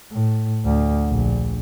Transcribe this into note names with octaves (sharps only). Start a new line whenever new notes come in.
A2
D2
A#1